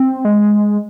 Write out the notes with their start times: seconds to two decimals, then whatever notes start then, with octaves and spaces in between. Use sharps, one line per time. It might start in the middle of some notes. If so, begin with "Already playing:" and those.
Already playing: C4
0.25 G#3